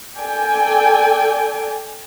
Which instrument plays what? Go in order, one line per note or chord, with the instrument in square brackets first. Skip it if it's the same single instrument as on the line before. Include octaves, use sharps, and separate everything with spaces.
[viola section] A4 D5 G5 G#5